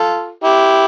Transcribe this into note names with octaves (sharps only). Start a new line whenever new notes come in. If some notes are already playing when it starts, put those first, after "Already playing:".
Already playing: F4 A4
E4 G4